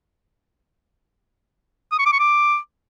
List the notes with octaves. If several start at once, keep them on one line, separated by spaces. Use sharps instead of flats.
D#6
C#6
D6
C#6
D6